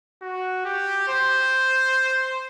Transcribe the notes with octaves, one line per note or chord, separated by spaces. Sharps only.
F#4
G4
C5